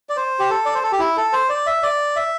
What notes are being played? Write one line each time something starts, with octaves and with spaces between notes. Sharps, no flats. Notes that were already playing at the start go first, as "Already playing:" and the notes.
D5
C5
G4
A4
D5
C5
A4
G4
E4
A4
C5
D5
E5
D5
E5